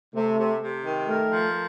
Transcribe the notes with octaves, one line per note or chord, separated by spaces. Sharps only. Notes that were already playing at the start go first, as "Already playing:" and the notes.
C3 A3
C3
C3
D#3
A3 A#4
F3